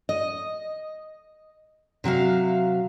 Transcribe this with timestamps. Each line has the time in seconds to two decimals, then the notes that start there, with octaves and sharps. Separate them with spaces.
0.09 D#5
2.04 C3 F#3 E5 F5